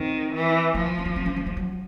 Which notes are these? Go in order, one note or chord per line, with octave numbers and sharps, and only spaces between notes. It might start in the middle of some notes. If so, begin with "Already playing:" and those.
Already playing: D#3 C4
E3
F3 B3
C4
B3
C4
C#4
A3
G#3
F#3